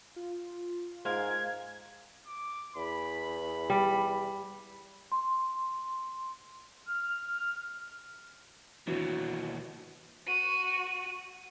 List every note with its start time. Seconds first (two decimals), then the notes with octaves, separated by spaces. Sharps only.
0.16 F4
1.05 G#2 G#3 A#4 F5 G#6
2.27 D6
2.76 E2 B5
3.70 G3
5.12 C6
6.88 F6
8.87 D#2 B2 E3 D4 F#4
10.26 F#4 D#7